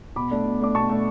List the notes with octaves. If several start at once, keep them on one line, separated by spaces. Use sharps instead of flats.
B2 B5 D6
A3 D4
B2
A3 D4 D6
B2 A5 C#6
A3 D4